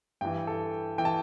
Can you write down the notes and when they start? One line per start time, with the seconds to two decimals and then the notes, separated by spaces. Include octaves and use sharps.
0.21 G2 E3 G5
0.47 A4
0.98 E3 G5
1.05 A5